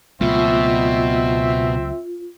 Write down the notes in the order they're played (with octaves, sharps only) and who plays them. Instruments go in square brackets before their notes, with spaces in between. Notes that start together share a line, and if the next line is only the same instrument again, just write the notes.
[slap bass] C#2 F#3 A3 [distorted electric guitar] B2 [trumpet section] C4 E5 [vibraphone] F4